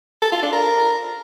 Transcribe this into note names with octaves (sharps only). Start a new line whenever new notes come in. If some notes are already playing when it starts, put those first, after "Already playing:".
A4
F4
D4
A#4